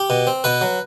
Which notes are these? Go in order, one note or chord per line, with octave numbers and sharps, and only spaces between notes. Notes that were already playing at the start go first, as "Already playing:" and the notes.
Already playing: G4
B2
C4
B2 B4
F#3